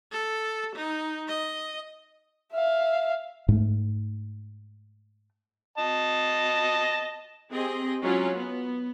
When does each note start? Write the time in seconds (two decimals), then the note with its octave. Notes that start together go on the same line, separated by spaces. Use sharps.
0.12 A4
0.76 D#4
1.28 D#5
2.53 E5 F5
3.48 G#2 A3
5.78 D#5 A5
7.51 C4 G4 G#4 D#5
8.02 F#3 G#3 C#4 F4
8.34 B3